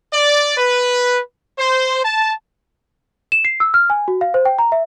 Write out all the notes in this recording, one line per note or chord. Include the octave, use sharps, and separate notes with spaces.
D5
B4
C5
A5
E7
C7
E6
F6
G#5
F#4
F5
C5
G5
A#5
E5